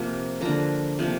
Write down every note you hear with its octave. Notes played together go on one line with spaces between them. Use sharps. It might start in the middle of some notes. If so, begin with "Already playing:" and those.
Already playing: C3 F3 A#3
D3 F3 A#3 A#5
C3 F3 A#3